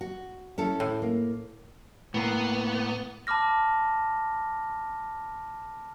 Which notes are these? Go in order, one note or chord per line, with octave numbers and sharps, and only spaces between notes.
F#4
C#4 E4 A4
A2
A#3
A2 A#3 B3
A5 B5 D6 F6 A#6